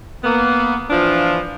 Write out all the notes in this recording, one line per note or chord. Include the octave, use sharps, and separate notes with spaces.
A#3 B3
E3 F3 D4 F4